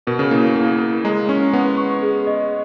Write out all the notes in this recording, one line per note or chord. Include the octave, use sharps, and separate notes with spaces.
B2 A#4
C#3
A#3 E4
A#3 E4
A#4
G#3 A#5
C#4 C#6
B3 F#5
C#6
G#4
D#5